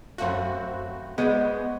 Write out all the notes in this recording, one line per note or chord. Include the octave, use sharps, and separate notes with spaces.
F#2 A3 C4 F#4 B4 F5
G#3 B3 F#4 D5 F#5 C6 D#6 G6